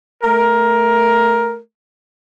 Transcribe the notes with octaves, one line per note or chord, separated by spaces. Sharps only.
A3 A#4